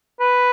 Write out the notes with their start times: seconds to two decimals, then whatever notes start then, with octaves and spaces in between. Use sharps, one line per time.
0.20 B4